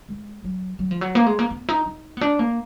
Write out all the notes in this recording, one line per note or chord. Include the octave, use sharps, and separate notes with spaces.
G#3
F#3
F#3
F3
F#3
A#3
G#3
A#3
B3
D#4
D#4
B3
D4
A#3